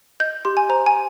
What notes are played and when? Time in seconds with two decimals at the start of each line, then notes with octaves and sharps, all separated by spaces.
0.20 D#5 G6
0.45 G4 C6
0.57 G#5
0.69 C5 A#5
0.86 G#5